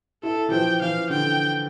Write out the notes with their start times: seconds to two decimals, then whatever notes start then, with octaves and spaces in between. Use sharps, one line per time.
0.23 E4 A4
0.48 E3
0.52 F3 G5
0.82 E3 F5
1.10 D3 G5